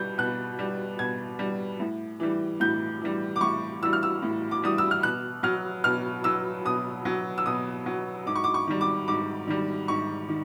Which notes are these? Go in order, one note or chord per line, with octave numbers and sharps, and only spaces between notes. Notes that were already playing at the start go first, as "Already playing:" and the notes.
Already playing: B2 G3 G6
B2 F#6
G3
B2 G#6
G3
A2
E3 G3
A2 G6
E3 G3
D6
A2 C#6
E3 G3 E6
F6
E6
A2
D6
E3 G3 D#6
E6
F6
B2 F#6
F#3 F6
B2 F6
F#3 E6
B2 D#6
F#3
E6
B2 D#6
F#3
G#2 D6
C#6
D6
C#6
D#3 G3
D6
G#2 D6
D#3 G3
G#2 C#6
D#3